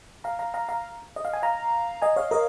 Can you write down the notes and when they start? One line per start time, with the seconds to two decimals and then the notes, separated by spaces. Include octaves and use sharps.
0.24 F5 A#5
0.39 F5 A#5
0.54 F5 A#5
0.69 F5 A#5
1.16 D#5
1.25 F5
1.33 G#5
1.43 F5 A#5
2.02 D#5 G#5
2.16 C#5 F5
2.31 A#4 D#5